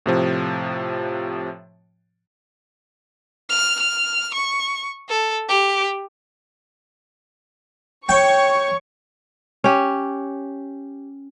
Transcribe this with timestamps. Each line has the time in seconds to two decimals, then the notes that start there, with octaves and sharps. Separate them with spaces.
0.06 A2 C3 F3
3.50 F6
3.79 F6
4.34 C#6
5.09 A4
5.49 G4
8.09 C#5 G5 C#6
9.64 C#4 G4